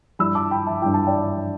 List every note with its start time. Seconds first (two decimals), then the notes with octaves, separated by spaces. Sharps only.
0.19 G2 G3 E4 B5 E6
0.35 A5 D6
0.51 G5 B5
0.67 E5 A5
0.82 G2 G3 E4 G5
0.94 A5
1.07 D5 G5